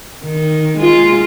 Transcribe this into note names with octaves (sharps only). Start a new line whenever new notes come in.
D#3
G#3 F4